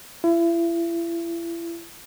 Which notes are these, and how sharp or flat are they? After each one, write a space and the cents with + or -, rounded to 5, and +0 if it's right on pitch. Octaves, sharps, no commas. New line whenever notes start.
E4 +35